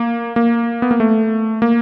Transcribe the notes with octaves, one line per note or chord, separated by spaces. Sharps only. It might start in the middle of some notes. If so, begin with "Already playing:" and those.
Already playing: A#3
A#3
B3
A#3
A3
A#3